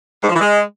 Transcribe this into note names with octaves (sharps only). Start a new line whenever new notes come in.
G#2
F3
E3
G#3